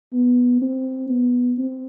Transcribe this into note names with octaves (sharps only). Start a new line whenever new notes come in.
B3
C4
B3
C4